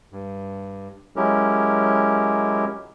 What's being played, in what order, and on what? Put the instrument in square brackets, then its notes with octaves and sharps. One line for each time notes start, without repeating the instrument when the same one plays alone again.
[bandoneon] G2
F#3 G#3 C#4 E4 G4 A#4